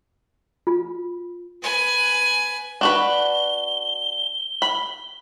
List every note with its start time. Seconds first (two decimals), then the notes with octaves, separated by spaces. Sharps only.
0.67 F4
1.63 B4 G#5
2.81 D4 F#4 B4 G7
4.62 B5